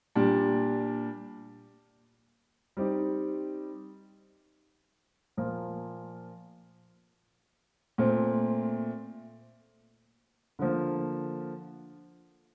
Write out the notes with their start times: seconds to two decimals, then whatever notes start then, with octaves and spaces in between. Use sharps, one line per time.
0.15 A#2 G3 D4 G4
2.77 G3 C4 D#4 G4
5.37 A#2 F3 A#3 F4
7.98 A#2 A3 C4
10.59 D3 F3 A#3